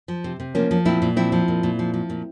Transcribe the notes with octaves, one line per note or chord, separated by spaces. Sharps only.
F3
C3
C3
F3 A#3 C#4
F3
A#2 C4 E4
A#2
F3 C4 E4
F3
A#2
A#2
F3
F3
A#2